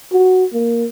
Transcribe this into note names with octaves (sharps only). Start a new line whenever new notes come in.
F#4
A#3